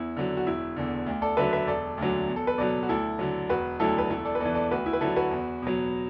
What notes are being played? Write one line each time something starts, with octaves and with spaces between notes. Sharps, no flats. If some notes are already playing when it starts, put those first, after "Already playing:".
Already playing: E2 E4
D3 F#3
F#4
E1 E4
E2 D3
D2
A4 D5
D3 F#3 B4 E5
B4 E5
E1 A4 D5
D2 D3 F#3
E2
A4
B4
B2 F#3 A4 D5
F#4
D2 E4 A4
D3 F#3
E1 F#4 B4
D2 D3 F#3 E4 A4
B4
E1 E4 A4
A4 D5
B4
E2 E3 A4 D5
A4 D5
D2 F#4 B4
E4
B4
D3 F#3 E4 A4
F#4 B4
E2
B2 F#3